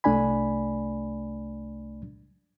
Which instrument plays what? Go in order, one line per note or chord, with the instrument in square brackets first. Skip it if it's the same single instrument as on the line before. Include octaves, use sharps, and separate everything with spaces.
[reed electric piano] C2 A3 D4 D5 G#5 B5